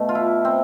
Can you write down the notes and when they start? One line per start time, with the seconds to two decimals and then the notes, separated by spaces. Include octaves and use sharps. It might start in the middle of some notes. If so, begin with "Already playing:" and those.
Already playing: B2 A3
0.09 F4
0.15 E4
0.45 C4